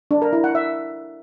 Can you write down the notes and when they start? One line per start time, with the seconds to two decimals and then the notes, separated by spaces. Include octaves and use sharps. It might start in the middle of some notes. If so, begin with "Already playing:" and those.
0.11 D4
0.22 A#4
0.33 E4
0.44 F#5
0.55 E5